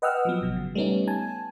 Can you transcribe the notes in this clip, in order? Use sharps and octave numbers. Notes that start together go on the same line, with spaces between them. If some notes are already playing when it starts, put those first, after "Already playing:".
B4 D#5 F#5 G5 E6 F6
F3 F#3 B3
G#1 B2
C#3
G3 A3 B3 C#4 D#4
G#5 A5